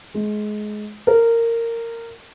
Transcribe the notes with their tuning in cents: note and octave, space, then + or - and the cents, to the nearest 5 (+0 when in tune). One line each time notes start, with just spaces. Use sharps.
G#3 +25
A#4 -15